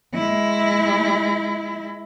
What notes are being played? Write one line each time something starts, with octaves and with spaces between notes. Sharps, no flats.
G#3 E4